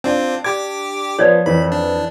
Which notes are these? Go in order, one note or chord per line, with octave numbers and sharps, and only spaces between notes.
C4 D4 F4
G4 D6 G#6
F3 B3 C#5 D5
F2 E3 B5
D4